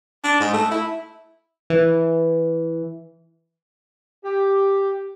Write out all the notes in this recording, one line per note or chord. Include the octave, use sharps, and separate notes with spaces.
D4
G#2
A3
E4
E3
G4